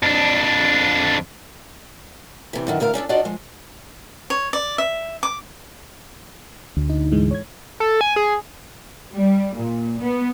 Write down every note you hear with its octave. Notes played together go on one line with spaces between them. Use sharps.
F2 D4
C3 E3
F#2 D3 D#3
D2 D3 A#4 F5
C#4 D4 G#4 A4
D4 D#4 F4 F#4 D5 D#5
F3 G#3
C#5
D5
E5
D6
D2
D#4
G#2 E3 G#3
C#5 G#6
A4
G#5
G#4
G3
A#2
B3